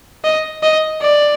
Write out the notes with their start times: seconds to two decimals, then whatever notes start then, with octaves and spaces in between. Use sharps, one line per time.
0.24 D#5
0.63 D#5
1.02 D5